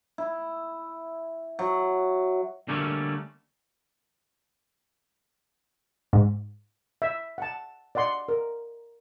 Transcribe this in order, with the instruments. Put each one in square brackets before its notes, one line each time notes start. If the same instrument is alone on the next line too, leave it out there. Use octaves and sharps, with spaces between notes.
[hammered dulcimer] E4
F#3
[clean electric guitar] D3 G3 A3 A#3 C#4
[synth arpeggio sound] G#2
[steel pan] E5
F#5 A5
D5 D#5 F#5 C6
A#4